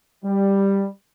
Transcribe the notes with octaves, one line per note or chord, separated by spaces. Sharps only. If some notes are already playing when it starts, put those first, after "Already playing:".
G3